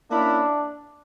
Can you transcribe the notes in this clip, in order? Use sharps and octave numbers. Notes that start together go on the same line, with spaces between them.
A#3 C#4 D4 E4 A#4 E5